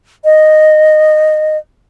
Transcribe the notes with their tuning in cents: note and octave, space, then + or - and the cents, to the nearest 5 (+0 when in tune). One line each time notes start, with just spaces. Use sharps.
D#5 -10